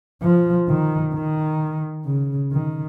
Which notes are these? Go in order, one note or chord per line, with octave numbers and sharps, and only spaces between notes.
F3
D#3
D#3
C#3
D#3